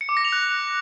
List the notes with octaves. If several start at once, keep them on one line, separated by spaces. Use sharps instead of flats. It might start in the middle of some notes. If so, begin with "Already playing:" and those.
C#7
D6
A#6
F7
F#6